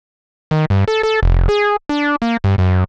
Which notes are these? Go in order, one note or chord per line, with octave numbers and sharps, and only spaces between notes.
D#3
G2
A4
A4
F1
G#4
D4
A#3
G2
F#2